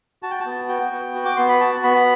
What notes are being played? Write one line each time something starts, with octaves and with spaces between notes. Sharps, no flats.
F#4 A5
G5
A5
B3
F#4 G5
B3
F#4
D6
B3 C6
B5
F#4 A5
B3 B5